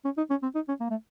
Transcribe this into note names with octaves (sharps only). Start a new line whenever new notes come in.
C#4
D#4
C#4
C4
D#4
C#4
A#3
A3